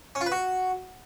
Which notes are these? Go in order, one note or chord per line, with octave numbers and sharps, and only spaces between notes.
C#4
F4
B4
F#4